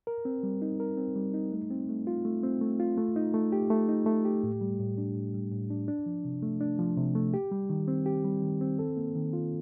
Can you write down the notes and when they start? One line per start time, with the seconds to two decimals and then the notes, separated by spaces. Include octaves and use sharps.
0.07 A#4
0.25 C4
0.43 G3
0.62 D#4
0.80 A#4
0.98 C4
1.16 G3
1.34 D#4
1.52 A3
1.70 C4
1.89 A3
2.07 F4
2.25 A3
2.43 C4
2.61 A3
2.80 F4
2.97 A3
3.16 D#4
3.34 A3
3.52 G4
3.70 A3
3.89 D#4
4.06 A3
4.25 G4
4.43 A2
4.61 G3
4.79 A2
4.98 D4
5.16 A2
5.34 G3
5.52 A2
5.70 D4
5.88 D4
6.06 F3
6.25 C3
6.43 A3
6.61 D4
6.79 F3
6.97 C3
7.15 A3
7.34 G4
7.52 G3
7.70 D#3
7.88 C4
8.06 G4
8.25 G3
8.42 D#3
8.61 C4
8.79 A4
8.97 A#3
9.15 D#3
9.33 F4